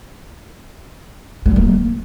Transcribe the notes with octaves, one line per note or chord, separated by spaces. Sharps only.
G3
C#4
A#3